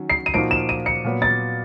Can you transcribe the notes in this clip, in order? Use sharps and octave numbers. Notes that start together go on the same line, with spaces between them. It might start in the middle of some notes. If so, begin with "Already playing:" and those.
Already playing: D#3 F#3 C#4
C7
D#7
A#2 F3 A#3 D#4 F#4 D7
E7
D#7
C#7
A#2 F#3 B3
A6